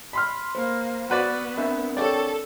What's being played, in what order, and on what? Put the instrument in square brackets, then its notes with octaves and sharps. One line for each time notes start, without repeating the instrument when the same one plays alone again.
[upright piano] B5 C6 F6 [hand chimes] B6
[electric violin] A#3 [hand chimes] C5
[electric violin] B3 [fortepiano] F#4 B4 D5 [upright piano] B5
[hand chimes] C4 D4 A#4 [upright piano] E5 B5
[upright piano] G4 C#5 G5 [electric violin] A4 [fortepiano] D5